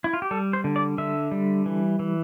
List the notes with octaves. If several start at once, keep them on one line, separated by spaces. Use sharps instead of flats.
E4
F4
G4
G3 A4
C5
D3
D5
D3 E5
G3
E3
E3